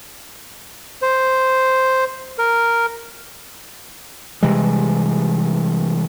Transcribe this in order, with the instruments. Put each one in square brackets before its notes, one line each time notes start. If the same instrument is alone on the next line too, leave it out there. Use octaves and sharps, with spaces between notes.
[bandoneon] C5
A#4
[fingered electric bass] C3 E3 G3 G#3